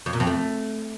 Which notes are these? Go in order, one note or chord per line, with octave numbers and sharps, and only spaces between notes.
F2
A#2
F2
A3